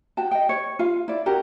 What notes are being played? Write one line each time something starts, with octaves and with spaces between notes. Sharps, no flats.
F#4 G5 A5
D#5 G5
C#5
F4 F5
E4 D5
C#4 F#4 G4 A#4